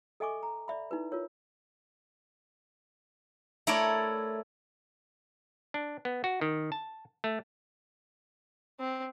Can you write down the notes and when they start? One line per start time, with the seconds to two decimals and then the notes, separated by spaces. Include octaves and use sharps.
0.20 A4 D#5 E5 G#5 C#6 D6
0.43 A#5
0.68 D5 E5 B5
0.91 D#4 E4 B4
1.12 F4 A#4 C#5
3.67 A3 E4 A4 A#4 C#5 D5
5.74 D4
6.05 B3
6.24 F#4
6.41 D#3
6.72 A5
7.24 A3
8.80 C4